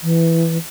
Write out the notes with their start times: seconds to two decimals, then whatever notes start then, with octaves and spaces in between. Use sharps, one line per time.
0.03 E3